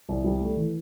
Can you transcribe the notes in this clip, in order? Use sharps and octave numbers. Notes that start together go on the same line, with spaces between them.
C2
G3
A3
E3